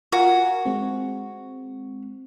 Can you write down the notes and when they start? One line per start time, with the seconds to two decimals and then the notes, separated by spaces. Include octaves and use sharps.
0.12 F4 F#4 A#4 G#5
0.66 G#3 C4